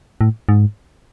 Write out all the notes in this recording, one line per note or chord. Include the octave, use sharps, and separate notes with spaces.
A2
G#2